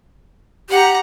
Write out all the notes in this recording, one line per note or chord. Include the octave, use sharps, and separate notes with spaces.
G4 F#5 A#5